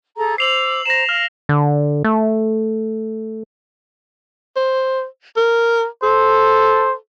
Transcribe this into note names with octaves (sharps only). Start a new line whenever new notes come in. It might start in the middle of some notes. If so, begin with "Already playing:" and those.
G#4 A4 A#5
C5 D6 E6 C7 F7 F#7
C5 A#5 A#6 E7
F5 F6
D3
A3
C5
A#4
A4 C5